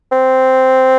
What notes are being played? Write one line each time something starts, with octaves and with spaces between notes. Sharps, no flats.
C4